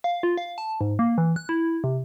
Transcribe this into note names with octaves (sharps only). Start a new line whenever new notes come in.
F5
F4
F5
A5
G#2
A#3
E3
F#6
E4
C3